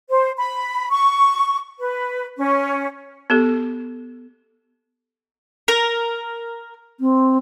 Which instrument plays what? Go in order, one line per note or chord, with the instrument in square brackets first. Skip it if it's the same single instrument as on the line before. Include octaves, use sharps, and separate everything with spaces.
[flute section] C5
B5
C#6
B4
C#4
[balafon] B3 G4 A4
[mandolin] A#4
[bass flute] C4